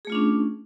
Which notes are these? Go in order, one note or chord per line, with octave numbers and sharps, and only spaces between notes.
A3 C#4 D4 F4 G#4